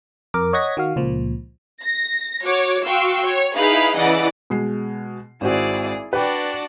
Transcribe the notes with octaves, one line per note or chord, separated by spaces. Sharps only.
F2 A#4 D6
C#5 D#5 F#5 G#6 A#6 B6
D#3 F#4 F5
C#2 A#2 F3
A#6
F#4 C#5 D6
F#4 F5 G5 C6 C#6 E6
C#5 C#6
D#4 E4 G#4 B4 F5 B5
C#3 E3 D5 D#5 F#5
B2 G#3 C7
G#1 C4 E4 F#4 G#4 D5
D4 F#4 B4 D5 G5